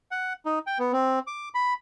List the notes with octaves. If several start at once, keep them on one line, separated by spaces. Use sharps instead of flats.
F#5
D#4
G5
B3
C4
D6
B5